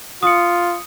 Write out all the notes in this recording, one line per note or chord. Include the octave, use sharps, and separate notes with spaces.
F4 D#6 C#7